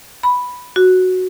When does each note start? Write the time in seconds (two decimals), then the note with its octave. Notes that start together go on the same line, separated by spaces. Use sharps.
0.23 B5
0.76 F#4